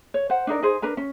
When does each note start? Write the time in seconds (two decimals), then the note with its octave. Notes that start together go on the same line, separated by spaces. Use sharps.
0.14 C#5
0.30 C5 F#5
0.47 D4 D#4 A#4 D5
0.62 D#4 G#4 C5
0.82 D4 A#4 B4 A#5
0.97 C#4